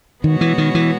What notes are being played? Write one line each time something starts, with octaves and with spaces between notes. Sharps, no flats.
B2 D#3 G#3 B3 F#4 C#5
E3
D#3
E3